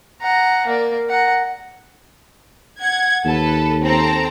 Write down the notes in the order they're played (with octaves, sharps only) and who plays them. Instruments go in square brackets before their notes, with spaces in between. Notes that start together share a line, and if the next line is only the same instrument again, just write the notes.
[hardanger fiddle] F#5 A#5
A#3 D5
F#5 A#5
[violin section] F#5 G#6
[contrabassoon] D#2 [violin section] A4 B4
[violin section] C4 A4 A#5